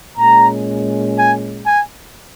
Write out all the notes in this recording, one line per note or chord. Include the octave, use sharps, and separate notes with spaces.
A#2 G#3 C#4 A#5
G#5
G#5